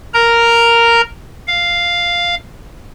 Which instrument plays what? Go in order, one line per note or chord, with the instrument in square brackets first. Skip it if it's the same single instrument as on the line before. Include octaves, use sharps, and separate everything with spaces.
[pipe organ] A#4 A#5
F5